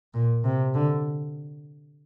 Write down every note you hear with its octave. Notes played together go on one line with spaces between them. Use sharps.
A#2
C3
D3